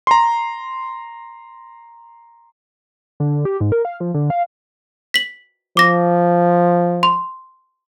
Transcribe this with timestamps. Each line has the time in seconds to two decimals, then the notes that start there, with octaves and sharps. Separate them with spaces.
0.07 A#5 C6
3.20 D3
3.45 G4
3.61 G#2
3.72 A#4
3.85 F5
4.00 F3
4.14 D3
4.30 F5
5.14 B6 F#7
5.77 F3 D6 A#6
7.03 C6